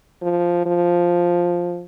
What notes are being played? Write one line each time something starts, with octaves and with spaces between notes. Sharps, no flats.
F3
F3